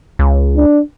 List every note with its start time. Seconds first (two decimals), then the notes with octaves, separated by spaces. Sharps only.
0.19 C#2
0.57 D4